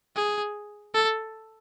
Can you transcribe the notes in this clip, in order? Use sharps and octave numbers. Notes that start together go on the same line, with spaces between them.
G#4
A4